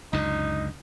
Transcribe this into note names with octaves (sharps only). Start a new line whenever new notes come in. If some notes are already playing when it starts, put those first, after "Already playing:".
C#2 F#2 D3 D#4